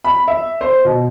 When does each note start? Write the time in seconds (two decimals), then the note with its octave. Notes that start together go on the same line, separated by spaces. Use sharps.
0.04 B5
0.28 E5
0.61 C5
0.85 B2